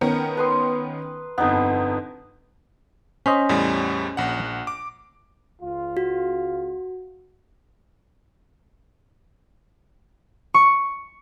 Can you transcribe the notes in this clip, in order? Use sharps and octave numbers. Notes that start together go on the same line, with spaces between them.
D#3 B3 C#4 A#4
B4 C6 D#6
G1 F2 B3 D#4
C#4 C5 D#5 B6
E2 A2 G3
A#1 F#5
D6
C#2 F4
F#4
C#6